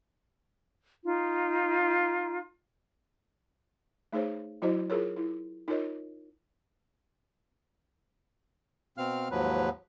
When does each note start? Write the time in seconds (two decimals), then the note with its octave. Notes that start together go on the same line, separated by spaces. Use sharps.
1.04 D#4 F4
4.13 A3 D#4 G#4 C5 C#5
4.62 F#3 E4 F#4 C5 D#5
4.90 F4 G#4 A#4 C#5
5.16 E4
5.68 D#4 F4 A#4 C#5 D#5
8.98 B2 C4 F5 F6
9.31 D#2 G#2 F3 F#3 B4